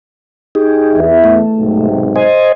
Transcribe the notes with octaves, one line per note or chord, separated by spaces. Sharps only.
D#4 G4 G#4
E2 E5
A3
B1 G#2 C3
C5 D#5 G#5